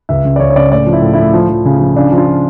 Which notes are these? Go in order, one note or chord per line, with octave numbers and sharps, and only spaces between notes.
C#2 E5
C#3
D5
C#2 C#5
C#5
C#3 D5
A2 D5
F3
E4
A2
E4
A2
F3
F3
C#3
F3
C#3 D4
F3
F4